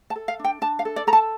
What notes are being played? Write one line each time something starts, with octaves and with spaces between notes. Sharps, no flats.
A5
A4
F5
D4
G5
D4 A5
F5
A4
D5
A4 A#5
A5